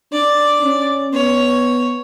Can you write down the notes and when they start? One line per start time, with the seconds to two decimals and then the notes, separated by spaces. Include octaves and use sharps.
0.12 D4 D5
0.62 C#4
1.13 B3 C#5